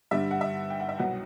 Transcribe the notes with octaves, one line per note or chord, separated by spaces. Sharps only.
G2 D3 G3 E5
F#5
E5
G5
F#5
E5
C2 B2 F#3 F#5